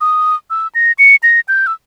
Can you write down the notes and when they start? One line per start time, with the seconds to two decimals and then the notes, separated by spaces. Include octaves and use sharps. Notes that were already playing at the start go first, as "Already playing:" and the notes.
0.01 D#6
0.50 E6
0.75 A#6
0.99 C#7
1.23 A#6
1.48 G6
1.67 E6